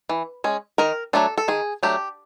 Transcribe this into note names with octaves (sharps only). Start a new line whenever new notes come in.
E3
G#3 C#4
D#3 A#4
F#3 A3 D4 A4
A4
D#3 G#4
F#3 A3 D4 G4